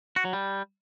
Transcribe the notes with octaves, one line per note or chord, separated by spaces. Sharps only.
F#4
F#3
G3